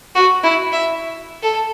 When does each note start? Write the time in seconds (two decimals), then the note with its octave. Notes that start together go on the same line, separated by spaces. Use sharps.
0.15 F#4
0.43 E4
0.72 E5
1.43 A4